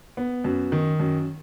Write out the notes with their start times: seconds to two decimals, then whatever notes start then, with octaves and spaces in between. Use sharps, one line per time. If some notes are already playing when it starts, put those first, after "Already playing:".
0.17 B3
0.44 F#2
0.72 D#3
1.00 F#2